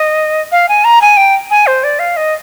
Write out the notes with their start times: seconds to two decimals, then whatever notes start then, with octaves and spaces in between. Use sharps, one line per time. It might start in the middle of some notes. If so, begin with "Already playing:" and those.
Already playing: D#5
0.52 F5
0.69 G#5
0.84 A#5
1.02 G#5
1.17 G5
1.51 G#5
1.67 C5
1.84 D5
1.99 F5
2.17 D#5